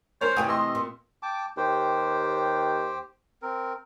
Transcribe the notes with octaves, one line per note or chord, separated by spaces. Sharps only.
C#4 A#4 C5 C#5
C3 E3 A3 G5 G#5 D#6
D#5 C6 E6
A#2
G5 A5 D6
D#2 G4 C5 G5
C4 A#4